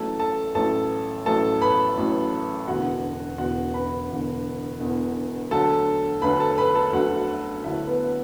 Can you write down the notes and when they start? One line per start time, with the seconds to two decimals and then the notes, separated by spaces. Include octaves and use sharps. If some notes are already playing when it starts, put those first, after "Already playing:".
Already playing: A1 A2 F#3 A4 A5
0.20 A4 A5
0.55 A1 A2 F#3 A4 A5
1.26 A1 A2 F#3 A4 A5
1.61 B4 B5
1.97 A1 A2 F#3
2.68 E1 E2 D3 F#4 F#5
3.38 E1 E2 D3 F#4 F#5
3.74 B4 B5
4.10 E1 E2 D3
4.80 E1 E2 D3
5.51 D2 D3 F#3 A4 A5
6.22 D2 D3 F#3 B4 B5
6.40 A4 A5
6.58 B4 B5
6.75 A4 A5
6.93 D2 D3 F#3 F#4 F#5
7.64 D2 D3 F#3 E4 E5
7.87 B3 B4